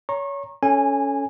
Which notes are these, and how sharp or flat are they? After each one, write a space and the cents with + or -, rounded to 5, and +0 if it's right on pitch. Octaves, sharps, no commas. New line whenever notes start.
C#5 +25 A#5 +0 C#6 -30
C#4 +10 A4 +0 G#5 -15